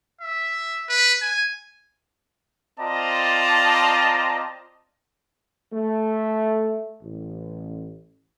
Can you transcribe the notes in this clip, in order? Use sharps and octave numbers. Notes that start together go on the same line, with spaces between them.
E5
B4
G#5
C4 F4 D5 D#5 A5 A#5
A3
A1